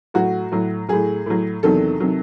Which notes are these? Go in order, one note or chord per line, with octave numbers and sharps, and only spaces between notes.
A2 F#3 F#4
A2 F#3
A2 F#3 G#4
A2 F#3
E2 C3 D#3 F#3 A4
C3 D#3 F#3